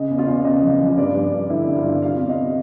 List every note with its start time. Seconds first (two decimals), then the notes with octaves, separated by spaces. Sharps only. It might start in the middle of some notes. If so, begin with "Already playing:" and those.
Already playing: C#3 D#5
0.10 E2
0.18 F4 F5
0.27 E2
0.45 C#3 D#5
0.62 F3
0.80 F3
0.97 G2 D5
1.15 G2
1.33 G2
1.49 D3 E4 E5
1.68 G2
1.76 F4 F5
1.85 G2
2.02 C3 F4 F5
2.20 E2
2.29 D#5
2.38 C3